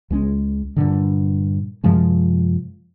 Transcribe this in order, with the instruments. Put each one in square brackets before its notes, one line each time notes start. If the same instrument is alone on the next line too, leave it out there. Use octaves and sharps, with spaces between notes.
[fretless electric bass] C#2 G#3 C4 C#4
G2 A#2 D3
F#2 C3 F3 G#3